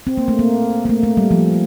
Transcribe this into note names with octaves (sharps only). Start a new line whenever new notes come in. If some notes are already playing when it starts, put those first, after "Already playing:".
C4
A#3
A3
A#3
A#3
A3
A3
G3
F3